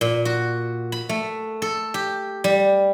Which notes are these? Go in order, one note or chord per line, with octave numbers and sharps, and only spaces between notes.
A#2
F#4
B5
A3
A4
G4
G3